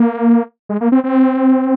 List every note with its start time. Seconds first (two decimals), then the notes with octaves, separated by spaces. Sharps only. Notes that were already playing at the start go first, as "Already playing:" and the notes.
Already playing: A#3
0.69 G#3
0.81 A#3
0.92 C4
1.04 C4